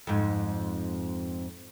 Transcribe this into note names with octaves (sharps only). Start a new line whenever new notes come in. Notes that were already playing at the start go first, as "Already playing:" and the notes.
F2 G#2